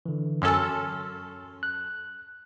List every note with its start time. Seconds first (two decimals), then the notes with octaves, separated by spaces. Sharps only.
0.06 D3 E3
0.42 F#2 C#4 A4 C6 F6
1.63 F#6